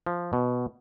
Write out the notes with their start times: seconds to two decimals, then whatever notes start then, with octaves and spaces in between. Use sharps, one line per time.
0.06 F3
0.33 B2